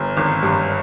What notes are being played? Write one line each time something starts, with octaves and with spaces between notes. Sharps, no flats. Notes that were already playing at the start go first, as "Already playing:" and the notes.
Already playing: G1
G#1
G2